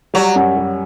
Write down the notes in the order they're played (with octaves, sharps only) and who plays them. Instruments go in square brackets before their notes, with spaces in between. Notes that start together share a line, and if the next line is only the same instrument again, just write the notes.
[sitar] F#3 [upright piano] G3
[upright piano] F#2
G3